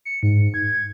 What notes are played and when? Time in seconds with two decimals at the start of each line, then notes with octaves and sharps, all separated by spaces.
0.05 C#7
0.23 G#2
0.54 G#6